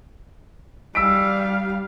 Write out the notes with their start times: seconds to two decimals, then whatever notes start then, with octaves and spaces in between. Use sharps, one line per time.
0.95 G3 F5 E6 B6 D7